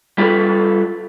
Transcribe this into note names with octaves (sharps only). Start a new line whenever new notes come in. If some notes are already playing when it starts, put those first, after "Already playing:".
G3 F4 G4 A4 B4